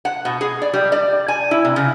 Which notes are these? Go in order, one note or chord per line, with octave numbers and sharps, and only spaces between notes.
F#5
B2
G#4
D5
G3
D5
G#5
E4
C3
C#3